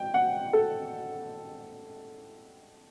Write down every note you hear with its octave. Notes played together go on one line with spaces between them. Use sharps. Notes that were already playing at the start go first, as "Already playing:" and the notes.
Already playing: G5
F#5
A4